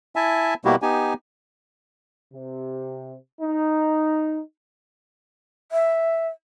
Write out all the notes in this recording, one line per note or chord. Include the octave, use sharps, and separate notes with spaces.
E4 E5 G#5 A5
B2 G3 A#3 E4 F#4 G4
B3 D#4 G4 G#5
C3
D#4
E5